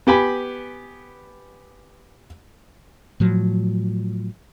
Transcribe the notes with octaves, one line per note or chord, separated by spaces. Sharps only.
B3 G4 G#5 B5
A2 F3 F#3